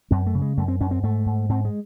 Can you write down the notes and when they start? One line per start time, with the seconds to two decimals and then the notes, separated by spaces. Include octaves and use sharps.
0.11 F#2 C4
0.26 A3
0.34 C#3
0.42 G#3
0.57 F#2 A3
0.68 C4
0.81 F#2 C#4
0.91 C4
1.03 G#2 A3
1.26 G#2
1.49 G#2 C4
1.65 G#3